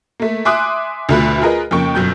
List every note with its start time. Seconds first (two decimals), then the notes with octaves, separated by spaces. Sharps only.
0.20 A3 A#3
0.45 E5 G#5 C6 D6 D#6 F#6
1.09 D2 B2 A3 F4 B5 F#6
1.42 F4 G#4 A#4 B4 D#5
1.71 F2 C#3 A#3 G5 C#6
1.95 G1 F#2 B2 G6